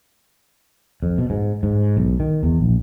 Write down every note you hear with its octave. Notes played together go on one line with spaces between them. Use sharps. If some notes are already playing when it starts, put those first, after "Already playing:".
F2
B2
G#2
G#2
B1
D#3
E2
A#1